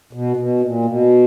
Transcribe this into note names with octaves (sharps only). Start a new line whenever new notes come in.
B2
B2
A#2
B2